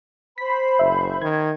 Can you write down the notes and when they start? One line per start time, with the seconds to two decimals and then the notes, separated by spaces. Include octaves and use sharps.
0.38 C5 B5 B6
0.79 F#1 E5
1.22 D#3 G#6